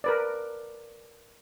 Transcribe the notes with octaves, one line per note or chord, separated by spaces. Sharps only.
A#4 B4 D5